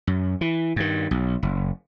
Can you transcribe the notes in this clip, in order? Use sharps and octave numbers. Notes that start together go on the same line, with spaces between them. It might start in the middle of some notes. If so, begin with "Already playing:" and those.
F#2
E3
G2 D#3
B1
F#1